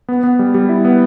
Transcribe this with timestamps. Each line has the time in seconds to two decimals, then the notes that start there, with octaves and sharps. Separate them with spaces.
0.08 B3
0.24 B3
0.39 G3
0.54 G3
0.69 E4
0.85 B3